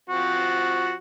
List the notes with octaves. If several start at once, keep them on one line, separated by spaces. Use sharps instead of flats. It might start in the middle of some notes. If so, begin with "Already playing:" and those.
F3 C4 F#4